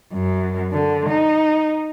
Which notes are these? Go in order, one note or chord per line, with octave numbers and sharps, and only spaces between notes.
F#2
D3
D#4